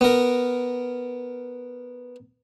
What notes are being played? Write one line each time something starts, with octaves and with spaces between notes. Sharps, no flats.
B3 A#4